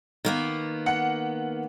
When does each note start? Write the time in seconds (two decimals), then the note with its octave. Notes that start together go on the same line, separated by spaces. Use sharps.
0.25 D#3 A#3 B3
0.86 F#5 C#7